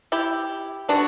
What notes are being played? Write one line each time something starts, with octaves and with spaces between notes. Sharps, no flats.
E4 G4
D3 G3 B3 D4 F#4